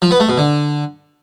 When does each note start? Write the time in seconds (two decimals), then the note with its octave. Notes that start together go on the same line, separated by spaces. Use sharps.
0.02 F3
0.11 B3
0.20 A3
0.29 B2
0.38 D3